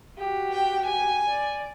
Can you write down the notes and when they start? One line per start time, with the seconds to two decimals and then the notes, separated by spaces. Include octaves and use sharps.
0.18 F#4 G4
0.52 G5
0.86 G#5
1.29 D5